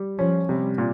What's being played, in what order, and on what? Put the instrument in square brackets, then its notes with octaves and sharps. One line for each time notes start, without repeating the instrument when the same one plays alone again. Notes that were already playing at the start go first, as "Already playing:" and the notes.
Already playing: [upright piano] G3
[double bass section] F3 [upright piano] C#4
[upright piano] C3 [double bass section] G3
[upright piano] A#2